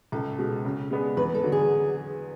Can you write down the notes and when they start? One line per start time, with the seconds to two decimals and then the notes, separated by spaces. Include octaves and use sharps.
0.12 C#2 A4
0.38 B2 G#3
0.65 C#3
0.91 G#3 B3 D4 G#4
1.17 E2 B4
1.35 A4
1.43 D3 F#3
1.52 G#4